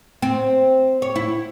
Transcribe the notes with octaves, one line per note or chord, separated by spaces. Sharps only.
C4
C#5
E4